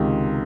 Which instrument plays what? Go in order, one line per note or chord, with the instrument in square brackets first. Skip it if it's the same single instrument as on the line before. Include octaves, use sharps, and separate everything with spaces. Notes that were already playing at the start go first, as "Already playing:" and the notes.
Already playing: [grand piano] C#2 C3 D#3